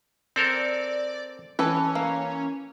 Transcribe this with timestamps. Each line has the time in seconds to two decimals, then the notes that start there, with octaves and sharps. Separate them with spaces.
0.36 C4 A4 A#4 D5
1.59 E3 C#4 A4 B4
1.95 A#3